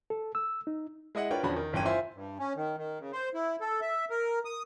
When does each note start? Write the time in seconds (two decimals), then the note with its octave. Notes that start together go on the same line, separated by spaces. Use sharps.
0.10 A4
0.35 E6
0.67 D#4
1.15 G#3 E4 D#5 F#5
1.30 D4 F4 A#4 B4 C#5 G5
1.43 E2 D3 F3 C#4 F#4 B5
1.56 D#3
1.73 G1 E3 C#4 G5 D#7
1.85 E4 F4 C5 E5 G#5 C6
2.14 G2
2.39 C#4
2.56 D#3
2.77 D#3
2.99 C#3
3.13 C5
3.34 E4
3.60 A4
3.81 E5
4.10 A#4
4.45 D#6